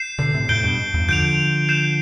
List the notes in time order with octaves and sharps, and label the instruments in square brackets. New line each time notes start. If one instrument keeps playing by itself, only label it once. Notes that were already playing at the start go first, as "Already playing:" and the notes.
Already playing: [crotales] G6 C7 E7
[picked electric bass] B2 D3
A2 C3
[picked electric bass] F2 A2 [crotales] G6 D7 G7
[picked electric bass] G2 B2
E2 G2
[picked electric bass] D3 F3 [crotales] G6 D7 F7
[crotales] G6 C7 E7